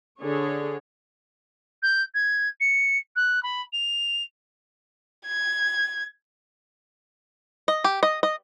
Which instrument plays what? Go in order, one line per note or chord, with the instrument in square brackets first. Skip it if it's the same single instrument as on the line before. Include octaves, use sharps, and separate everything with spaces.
[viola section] D3 G#4 C#5
[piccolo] G6
G#6
C#7
F#6
B5
F7
[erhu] G#6
[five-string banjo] D#5
G4
D#5
D#5